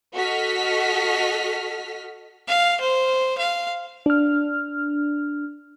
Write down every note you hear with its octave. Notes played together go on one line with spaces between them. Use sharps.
F#4 A4 D#5 F6 B6
F5
C5
F5
D4 F6